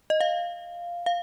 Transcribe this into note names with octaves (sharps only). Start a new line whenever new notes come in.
D#5
F5
F5